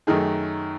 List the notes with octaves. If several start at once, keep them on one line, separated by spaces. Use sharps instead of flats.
F#2 D#3 A3 D#4 G#4